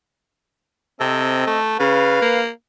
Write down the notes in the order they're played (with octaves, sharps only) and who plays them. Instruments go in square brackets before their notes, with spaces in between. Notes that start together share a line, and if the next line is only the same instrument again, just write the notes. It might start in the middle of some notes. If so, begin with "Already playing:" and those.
[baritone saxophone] C3 [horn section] C4 A4 D#5
[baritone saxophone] A3
[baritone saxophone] C#3 [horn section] B4 F5
[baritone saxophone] A#3